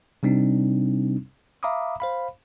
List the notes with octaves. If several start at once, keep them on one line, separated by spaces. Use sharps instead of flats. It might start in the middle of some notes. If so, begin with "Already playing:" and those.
C3 G3 C4 D4 D#4
E5 F5 A#5 B5 D6 D#6
C5 F5 B5